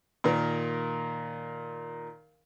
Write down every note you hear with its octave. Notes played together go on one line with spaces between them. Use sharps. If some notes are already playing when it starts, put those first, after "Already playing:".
A#2 D#3 A#4